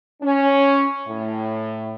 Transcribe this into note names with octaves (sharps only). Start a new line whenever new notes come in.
C#4
A2